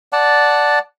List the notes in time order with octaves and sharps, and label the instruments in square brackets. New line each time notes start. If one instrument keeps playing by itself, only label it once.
[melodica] D5 F#5 A5